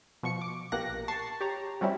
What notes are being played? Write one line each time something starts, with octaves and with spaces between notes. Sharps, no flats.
B2 F3 C#6 C#7
D6
A#1 B2 A#3 G4 F#6 A#6
A5 C#6 A6 C7
G4 C#5 A#5
F#3 G3 C4 C#4 E4